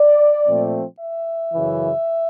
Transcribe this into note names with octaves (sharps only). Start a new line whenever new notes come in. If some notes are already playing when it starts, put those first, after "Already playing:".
Already playing: D5
A#2 F3 A3 C4
E5
F#2 C#3 E3